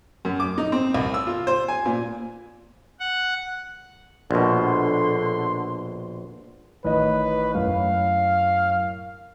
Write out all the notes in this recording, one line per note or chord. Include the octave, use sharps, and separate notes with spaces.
F#2
D6
D#4
C4
C2
E6
F4
C5
G#5
A#2
F#5
A#1 B2 D3 C6
A1 D#3 B4 D#5
F#2 A2 F5